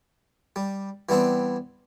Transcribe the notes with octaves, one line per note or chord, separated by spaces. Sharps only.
G3
E3 G3 B3 C4 D4